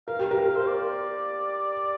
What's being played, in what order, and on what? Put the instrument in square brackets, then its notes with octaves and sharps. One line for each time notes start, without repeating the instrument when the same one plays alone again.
[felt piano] A#4 [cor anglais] F5
[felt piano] G4
A#4
[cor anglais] C5
D5